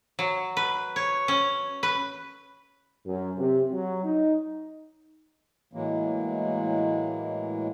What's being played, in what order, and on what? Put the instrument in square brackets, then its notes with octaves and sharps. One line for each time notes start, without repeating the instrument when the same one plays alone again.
[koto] F#3
B4
C#5
C#4
B4
[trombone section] F#2
C3
F#3
D#4
[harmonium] A2 E3 F#3 G#3 A#3